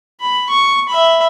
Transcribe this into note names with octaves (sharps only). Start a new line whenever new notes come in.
B5
C#6
E5 B5